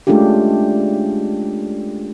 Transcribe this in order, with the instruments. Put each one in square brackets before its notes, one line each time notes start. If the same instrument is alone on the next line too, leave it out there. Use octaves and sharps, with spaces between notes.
[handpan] G#3 A3 C#4 D4 F4 G4